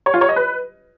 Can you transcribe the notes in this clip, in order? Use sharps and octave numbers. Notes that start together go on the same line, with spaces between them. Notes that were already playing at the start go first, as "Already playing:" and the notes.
C#5
F4
C#5
D#5
B4